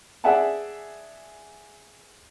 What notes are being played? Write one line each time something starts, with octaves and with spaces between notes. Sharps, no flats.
G#4 D5 E5 F#5 G#5 A5